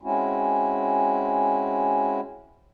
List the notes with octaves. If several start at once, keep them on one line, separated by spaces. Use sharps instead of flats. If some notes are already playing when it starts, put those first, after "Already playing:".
G#3 C4 C#4 E4 F#4